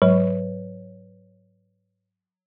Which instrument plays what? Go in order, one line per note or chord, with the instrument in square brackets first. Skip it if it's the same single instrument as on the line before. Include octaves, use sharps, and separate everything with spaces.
[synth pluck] G#2 B4 C#5 [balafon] F#3